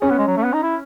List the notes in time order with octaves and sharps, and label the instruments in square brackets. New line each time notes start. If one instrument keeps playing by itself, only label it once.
[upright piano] C#4 [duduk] G#4
[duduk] B3
G#3
F#3
A3
B3
D#4
E4